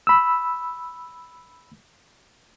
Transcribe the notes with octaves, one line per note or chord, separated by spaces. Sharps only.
B5 E6